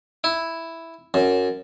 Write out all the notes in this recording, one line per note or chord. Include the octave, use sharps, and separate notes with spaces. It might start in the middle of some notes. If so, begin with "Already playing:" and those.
E4
F#2